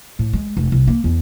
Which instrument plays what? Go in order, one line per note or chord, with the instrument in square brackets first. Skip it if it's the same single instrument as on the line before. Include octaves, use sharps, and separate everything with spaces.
[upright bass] A2
G#3
F1
C2
A#3
E2